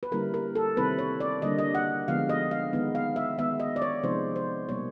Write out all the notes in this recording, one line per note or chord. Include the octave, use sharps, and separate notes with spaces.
B4
D3 G3 A#3 C#4 E4 A#4
A#4
A4
C3 D#3 G3 C4 E4 B4
C#5
D5
D3 G3 A#3 D4 D#5
D#5
F#5
D3 F3 G#3 B3 F5
D#5
F5
D#3 G#3 B3 D#4
F5
E5
D#3 G#3 B3 E5
D#5
D5
C#5
C3 F3 G#3 B3 D#4 C5
C5
B2 G3 A#3 C#5